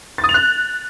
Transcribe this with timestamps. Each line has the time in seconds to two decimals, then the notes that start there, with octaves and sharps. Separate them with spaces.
0.18 A6
0.24 D#6
0.29 F7
0.34 F#6